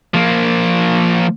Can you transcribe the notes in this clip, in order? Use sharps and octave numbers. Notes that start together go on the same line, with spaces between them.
F3 A#3